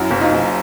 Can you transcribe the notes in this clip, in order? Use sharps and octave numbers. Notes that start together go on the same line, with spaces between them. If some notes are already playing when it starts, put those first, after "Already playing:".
Already playing: F#2 E4 F#4
F#1
D#4 F4
F#1